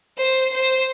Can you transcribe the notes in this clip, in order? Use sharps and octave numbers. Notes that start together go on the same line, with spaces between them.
C5
C5